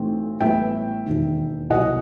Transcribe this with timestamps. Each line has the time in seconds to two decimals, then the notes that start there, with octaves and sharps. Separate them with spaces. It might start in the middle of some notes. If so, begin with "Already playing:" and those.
Already playing: B1 A2 E3 A3 C4
0.41 A1 A2 G3 B3 E5 G5
1.06 E1 D#2 D#3
1.70 C2 B2 F#3 D#5 F#5